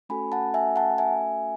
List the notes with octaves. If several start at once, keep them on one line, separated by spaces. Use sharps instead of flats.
A3 C#4 F#4 A4 G#5 B5
F#5 A5
E5 G#5
F#5 A5
E5 G#5